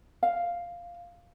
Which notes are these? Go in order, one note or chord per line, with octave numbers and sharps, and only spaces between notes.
F5